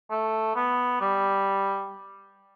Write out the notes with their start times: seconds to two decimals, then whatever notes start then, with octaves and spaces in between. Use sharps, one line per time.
0.11 A3
0.56 B3
1.01 G3